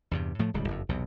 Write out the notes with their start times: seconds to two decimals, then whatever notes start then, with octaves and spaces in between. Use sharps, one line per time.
0.11 E2 G2 C3
0.39 A2 F3 A3
0.54 D1 C#2 G3
0.68 F#1 F2
0.89 B1 E2 C3